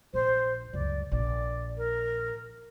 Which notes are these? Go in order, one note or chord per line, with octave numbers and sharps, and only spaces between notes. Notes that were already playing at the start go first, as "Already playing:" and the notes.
A#1 C5
C#2 F#2 D5
A#1 D5
A#4